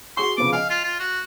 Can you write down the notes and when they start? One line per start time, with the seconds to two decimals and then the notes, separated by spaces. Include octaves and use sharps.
0.17 F#4 G#4 C6 C#6
0.38 C#3 F3 B3 D6
0.53 D#5 F5 G#5
0.70 F4
0.84 F4
1.00 F#4